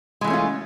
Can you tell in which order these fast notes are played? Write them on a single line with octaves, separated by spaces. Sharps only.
G#3 E3 A3 C#4 F4